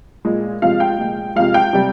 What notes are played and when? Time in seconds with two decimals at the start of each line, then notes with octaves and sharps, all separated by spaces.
0.25 A#2 G#3
0.62 C3 F3 G#3 F5
0.80 G5
0.99 A#2 F3 G#3
1.36 C3 F3 G#3 F5
1.54 G5
1.73 C3 G3